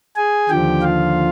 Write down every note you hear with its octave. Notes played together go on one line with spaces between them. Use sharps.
G#4 G#5
D#2 D3 F3 G4 G5
F4 F5